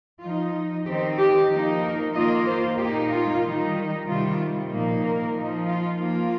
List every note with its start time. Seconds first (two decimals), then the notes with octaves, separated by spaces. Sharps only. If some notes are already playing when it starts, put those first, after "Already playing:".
0.22 F3 D#4 F4
0.86 D#3 C4 D#4 G4
1.18 G4
1.50 F3 A#3 D#4
1.82 A#4
2.14 D#3 A#3 F4 D#5
2.46 C5
2.78 A#2 A#3 D#4 G4
3.10 F4
3.42 D#3 G3 D#4
4.06 C3 D#3 G3 F4
4.70 A#2 F3 A#3 D#4
5.02 A#4
5.34 F3 D#4
5.66 F4
5.98 F3 A#3 F4